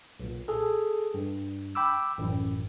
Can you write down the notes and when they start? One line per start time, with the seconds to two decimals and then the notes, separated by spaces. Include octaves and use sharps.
0.20 B1 A#2
0.48 G#4 A4
1.14 G2
1.75 G5 B5 D6 E6
2.18 A1 F#2